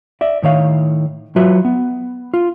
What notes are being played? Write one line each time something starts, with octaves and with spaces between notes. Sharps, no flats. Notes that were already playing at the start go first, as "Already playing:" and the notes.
D5 E5
A2 D#3 C#5 F5
F#3 F4 F#4 B4 E5
B3
F4